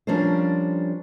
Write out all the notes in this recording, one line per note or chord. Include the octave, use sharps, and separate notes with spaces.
F3 G3 C#4 D4 A#4 C5